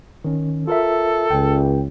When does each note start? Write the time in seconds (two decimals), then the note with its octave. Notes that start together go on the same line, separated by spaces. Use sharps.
0.25 D#3 C#4
0.67 F4 A4 A#4 E5
1.31 C#2 G5